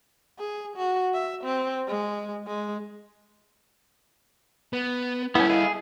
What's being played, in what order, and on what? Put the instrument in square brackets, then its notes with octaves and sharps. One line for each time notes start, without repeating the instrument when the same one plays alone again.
[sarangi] G#4
F#4
E5
C4
G#3
G#3
[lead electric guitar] B3 [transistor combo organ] B4
[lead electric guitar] G3 A4 [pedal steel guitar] B3 C#4 [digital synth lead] E4 [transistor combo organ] G5
[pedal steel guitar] G#4 [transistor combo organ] D#5 F5